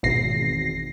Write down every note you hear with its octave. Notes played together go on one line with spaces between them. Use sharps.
G#1 E2 B2 A#6 C7